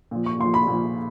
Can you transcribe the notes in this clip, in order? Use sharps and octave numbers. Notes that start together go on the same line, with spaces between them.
A#2 F3
C#6
A#2 F3 C6
B5
A#2 F3